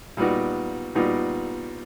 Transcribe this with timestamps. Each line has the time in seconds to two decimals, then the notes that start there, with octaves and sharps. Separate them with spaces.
0.17 A#2 G3 B3 D#4 F#4
0.95 A#2 G3 B3 D#4 F#4